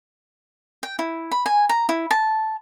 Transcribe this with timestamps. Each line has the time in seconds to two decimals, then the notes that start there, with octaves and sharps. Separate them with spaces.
0.83 G5
0.99 E4
1.32 B5
1.46 G#5
1.69 A#5
1.89 E4
2.11 A5